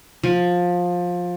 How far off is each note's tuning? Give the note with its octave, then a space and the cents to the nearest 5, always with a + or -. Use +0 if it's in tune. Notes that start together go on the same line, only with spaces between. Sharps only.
F3 +20